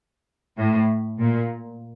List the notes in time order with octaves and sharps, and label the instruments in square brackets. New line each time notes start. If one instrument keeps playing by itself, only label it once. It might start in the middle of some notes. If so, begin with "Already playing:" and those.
[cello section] A2
A#2